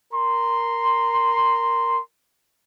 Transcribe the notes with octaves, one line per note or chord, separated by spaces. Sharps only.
A#4 A#5 C6